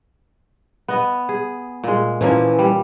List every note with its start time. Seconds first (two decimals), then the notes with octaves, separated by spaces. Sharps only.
0.88 B3 D#5
1.29 G#4
1.84 A#2 G#3
2.21 A#2 E3 F3 A#3 C#4
2.59 G3